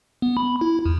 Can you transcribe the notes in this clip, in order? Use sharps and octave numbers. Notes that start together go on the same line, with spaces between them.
B3
B5
E4
E2